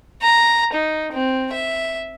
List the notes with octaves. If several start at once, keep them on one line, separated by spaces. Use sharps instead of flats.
A#5
D#4
C4
E5